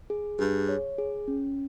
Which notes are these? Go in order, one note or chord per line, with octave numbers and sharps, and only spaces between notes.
G#4
G2 G#4
C#5
G#4
C#4